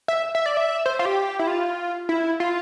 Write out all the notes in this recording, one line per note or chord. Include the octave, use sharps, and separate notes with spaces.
E5
E5
D5
E5
C5
F4
G4
E4
F4
E4
F4